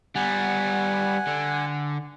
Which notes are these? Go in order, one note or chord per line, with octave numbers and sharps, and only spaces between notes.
G3 B3 F#5 G#5
D3